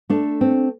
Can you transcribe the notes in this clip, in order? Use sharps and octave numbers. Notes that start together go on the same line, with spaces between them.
A3 D4
C4